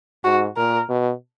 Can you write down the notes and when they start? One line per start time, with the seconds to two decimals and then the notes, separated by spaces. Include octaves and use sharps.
0.24 G#2 F#4
0.57 A#2 A#4
0.89 B2